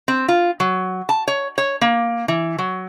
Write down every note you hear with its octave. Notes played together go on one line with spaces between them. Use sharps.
C4
F4
F#3
A5
C#5
C#5
A#3
E3
F#3